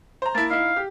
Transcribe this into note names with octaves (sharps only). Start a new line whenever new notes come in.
C5 A#5
A#3 E4 A5
D#4 E4 F5
G4